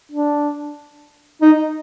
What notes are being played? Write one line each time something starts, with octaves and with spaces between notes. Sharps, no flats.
D4
D#4